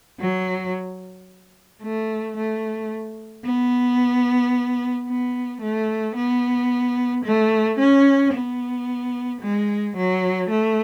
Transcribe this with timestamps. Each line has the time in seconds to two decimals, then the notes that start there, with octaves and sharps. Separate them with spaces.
0.19 F#3
1.82 A3
2.37 A3
3.44 B3
5.08 B3
5.61 A3
6.16 B3
7.25 A3
7.79 C#4
8.34 B3
9.41 G#3
9.96 F#3
10.50 A3